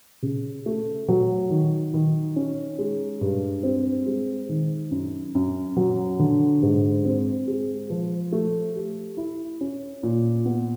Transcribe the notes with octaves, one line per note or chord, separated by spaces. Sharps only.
C#3
A3
F#3
D#3
D#3
C#4
G#3
G2
C4
G#3
D#3
F#2
F#2
F#3
D3
G#2
C4
G#3
F3
A3
G4
E4
C#4
A#2
B3